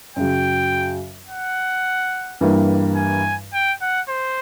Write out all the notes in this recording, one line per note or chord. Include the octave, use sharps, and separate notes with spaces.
F#2 C#3 F#3 G5
F#5
G2 E3 G3 A#3
G#5
G5
F#5
C5